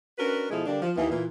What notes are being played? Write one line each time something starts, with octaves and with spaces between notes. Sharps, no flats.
C#4 D4 F#4 A#4 B4
B2 F3 G#3 E4 G#4 A4
D3 G3 A#3 D4
F3
D#2 E3 B3
A#2 E3